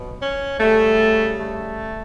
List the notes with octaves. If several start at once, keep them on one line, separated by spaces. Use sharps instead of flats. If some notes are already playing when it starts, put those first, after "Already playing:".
Already playing: B2 F#3
C#4
C#3 G3 A3
A3